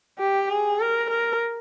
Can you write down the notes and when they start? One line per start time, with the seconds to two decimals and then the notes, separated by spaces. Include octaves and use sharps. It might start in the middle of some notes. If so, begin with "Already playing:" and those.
0.19 G4
0.50 G#4
0.80 A#4
1.11 A#4